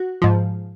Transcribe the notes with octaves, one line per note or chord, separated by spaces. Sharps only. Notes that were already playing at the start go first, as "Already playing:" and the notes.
Already playing: F#4
G#2 F3